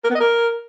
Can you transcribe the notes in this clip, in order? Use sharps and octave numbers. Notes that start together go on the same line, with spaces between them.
A#4
B3
D#5
A#4